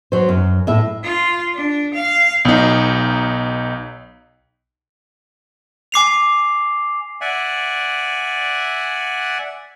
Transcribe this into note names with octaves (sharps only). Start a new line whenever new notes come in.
F#3 C5
F#2
A2 E5
F4
D4
F5
B1 D#4
G#5 D6 C7 F7
D5 E5 F#5 G#5